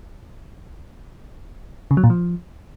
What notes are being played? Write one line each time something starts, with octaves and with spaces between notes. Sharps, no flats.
C#3
F#3
A#2
F3